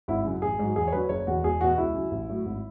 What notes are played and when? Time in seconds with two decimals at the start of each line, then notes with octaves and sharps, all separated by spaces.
0.08 G#1 E4
0.25 F#2 C#3
0.42 A1 G#4
0.59 G#2 F#3
0.76 E2 G#4
0.87 C#5
0.92 D3 F#3 B4
1.09 F#1 C#5
1.27 E2 B2 F#4
1.44 E1 G#4
1.60 E2 B2 F#4
1.78 C#2 E4
1.94 C#3 F#3
2.11 A1
2.29 A2 F#3
2.45 G#1